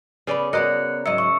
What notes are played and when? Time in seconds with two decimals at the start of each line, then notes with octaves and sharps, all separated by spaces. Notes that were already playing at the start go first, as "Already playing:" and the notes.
0.27 C#3 B3 C#4 B4 D5
0.53 B3 F#4 A#4 D5 D#5 F#6 C#7
1.06 G#2 F#3 D#5 E5 E6 C#7
1.18 C#6